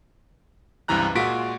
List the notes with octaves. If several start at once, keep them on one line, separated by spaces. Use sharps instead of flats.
C#2 G2 C3 E3 A#5 F#6
A#2 G#3 F4 F#4 B6 D7